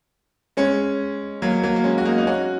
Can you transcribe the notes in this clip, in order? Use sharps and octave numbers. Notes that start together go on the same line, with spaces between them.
G#3 C#4
F#3 A#3
F#3 A#3
A#3
G#3 C#4
F#4
A#3 D#4
D#4
C#4 F#4